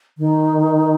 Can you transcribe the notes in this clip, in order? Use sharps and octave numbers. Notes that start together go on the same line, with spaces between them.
D#3